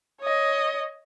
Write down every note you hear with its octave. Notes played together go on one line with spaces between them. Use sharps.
C#5 D#5